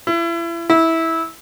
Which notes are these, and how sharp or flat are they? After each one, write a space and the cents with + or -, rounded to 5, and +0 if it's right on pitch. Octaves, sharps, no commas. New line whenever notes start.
E4 +35
E4 -15